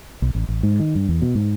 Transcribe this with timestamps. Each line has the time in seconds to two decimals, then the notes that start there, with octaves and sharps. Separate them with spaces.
0.22 B1
0.35 A1
0.49 A1
0.63 G#2
0.80 D#3
0.95 G2
1.09 E2
1.22 B2
1.35 G#2